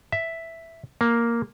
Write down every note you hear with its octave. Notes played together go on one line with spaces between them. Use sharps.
E5
A#3